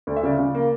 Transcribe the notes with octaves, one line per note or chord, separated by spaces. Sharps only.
D2 D5
E5
C#3 D5
C#3
A#3